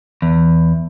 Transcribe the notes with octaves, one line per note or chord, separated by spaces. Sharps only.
E2